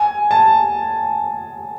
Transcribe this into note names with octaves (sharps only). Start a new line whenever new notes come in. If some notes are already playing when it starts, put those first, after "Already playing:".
Already playing: G#5
A5